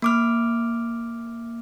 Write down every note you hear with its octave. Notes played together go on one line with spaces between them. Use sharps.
A#3 D6 F6